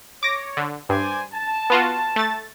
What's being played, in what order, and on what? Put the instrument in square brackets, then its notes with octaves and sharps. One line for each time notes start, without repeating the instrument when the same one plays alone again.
[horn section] C#5 [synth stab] D6 A#6
[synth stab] D3
[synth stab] G2 [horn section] C5 D5 G#5
[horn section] A5
[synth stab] B3 F4 F#4
A3 A6